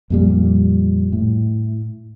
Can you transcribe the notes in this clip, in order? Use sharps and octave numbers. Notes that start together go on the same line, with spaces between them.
F2 A#2 G3
A2